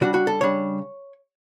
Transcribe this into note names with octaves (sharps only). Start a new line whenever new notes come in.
C#3 G3 D4 F#4
F#4
A4
C#3 G3 D4 C#5